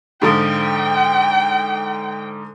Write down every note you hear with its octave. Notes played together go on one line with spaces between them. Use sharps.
G#2 D3 F3 G5